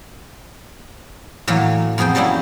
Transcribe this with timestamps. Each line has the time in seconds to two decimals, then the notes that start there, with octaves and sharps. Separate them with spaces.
1.47 A2 E3 F#3 A#3
1.98 F2 B3 G#4 C5 G5
2.15 F#3 G3 A#3 C#4 E4